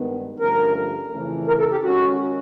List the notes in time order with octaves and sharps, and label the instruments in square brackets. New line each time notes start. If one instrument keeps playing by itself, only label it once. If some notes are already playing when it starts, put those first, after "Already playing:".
Already playing: [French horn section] G2 D#3 G#3 B3
[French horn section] G2 D3 F3 A3 C#4 [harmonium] A#4
[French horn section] F2 C#3 E3 A3 C#4
[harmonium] A#4
A4
G4
[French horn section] D#3 G#3 C#4 [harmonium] F#4